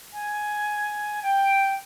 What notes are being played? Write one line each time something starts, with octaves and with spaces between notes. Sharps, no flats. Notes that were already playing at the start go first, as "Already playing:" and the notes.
G#5
G5